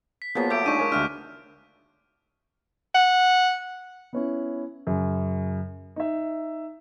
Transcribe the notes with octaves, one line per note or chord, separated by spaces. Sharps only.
B6
F3 F#3 A#3 B3 G#4
A3 D6 G6 D7
G#3 D4 D#4 C#6 D#7
A#4 C#5 G#5
D2 D4 F#4 E5 F6
F#5
B3 C#4 E4
F#2 C#3
D#4 E5